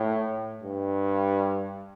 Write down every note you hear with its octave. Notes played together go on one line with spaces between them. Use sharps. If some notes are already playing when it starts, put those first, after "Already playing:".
Already playing: A2
G2